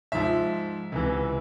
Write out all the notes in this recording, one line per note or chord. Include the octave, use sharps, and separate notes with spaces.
G#2 F3 E5
C#2 C3 E3